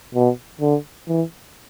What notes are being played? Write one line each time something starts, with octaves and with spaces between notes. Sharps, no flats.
B2
D3
E3